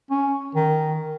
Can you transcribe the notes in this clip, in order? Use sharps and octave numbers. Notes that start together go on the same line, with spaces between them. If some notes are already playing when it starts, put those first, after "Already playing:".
C#4
D#3